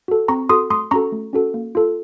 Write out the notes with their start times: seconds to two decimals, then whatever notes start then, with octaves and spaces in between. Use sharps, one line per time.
0.08 F#4 A4
0.28 C4 A#5 C#6
0.49 F#4 A4 C6 D#6
0.70 A3 C6 D#6
0.91 C#4 F#4 A4 A#5 C#6
1.12 A3
1.33 C#4 F#4 A4
1.54 A#3
1.75 F4 A4